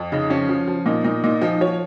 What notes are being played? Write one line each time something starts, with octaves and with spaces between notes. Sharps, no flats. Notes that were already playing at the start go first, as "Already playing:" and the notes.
Already playing: F2
C#3 D#4
F3 C#4
F3
F3
A#2 D#4
A#2 D#4
A#2 D#4
F3 D#4
F3 C#5